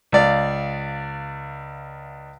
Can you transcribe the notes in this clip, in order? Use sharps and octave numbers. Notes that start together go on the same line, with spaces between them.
C#2 D5 F5